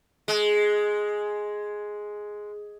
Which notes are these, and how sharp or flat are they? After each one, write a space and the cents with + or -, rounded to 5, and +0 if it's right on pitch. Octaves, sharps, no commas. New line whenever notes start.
G#3 +5